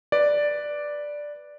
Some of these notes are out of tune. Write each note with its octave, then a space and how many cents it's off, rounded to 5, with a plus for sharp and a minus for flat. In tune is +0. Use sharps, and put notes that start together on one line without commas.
B4 -5 D5 +0